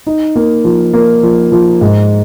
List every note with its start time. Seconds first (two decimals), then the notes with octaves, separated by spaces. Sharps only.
0.07 D#4
0.36 A#3
0.64 F3
0.93 A#3
1.23 F3
1.52 F3
1.81 G#2